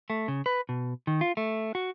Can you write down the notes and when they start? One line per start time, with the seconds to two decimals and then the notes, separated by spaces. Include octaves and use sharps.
0.10 A3
0.28 C#3
0.46 B4
0.69 B2
1.07 D#3
1.21 F4
1.37 A3
1.75 F#4